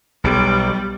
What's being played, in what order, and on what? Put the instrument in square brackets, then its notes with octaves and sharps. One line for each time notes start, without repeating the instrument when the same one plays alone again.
[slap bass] B1 [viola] G3